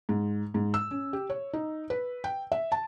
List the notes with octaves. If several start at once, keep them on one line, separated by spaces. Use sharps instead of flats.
G#2
G#2
E6
C#4
G4
C#5
D#4
B4
G5
E5
A5